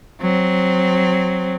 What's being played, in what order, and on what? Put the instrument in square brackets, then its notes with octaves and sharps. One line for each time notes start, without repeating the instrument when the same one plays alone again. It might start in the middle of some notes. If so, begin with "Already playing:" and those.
[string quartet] F#3 C4